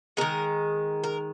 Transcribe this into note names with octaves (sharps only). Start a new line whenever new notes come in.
D#3 G#3 A#4
A#4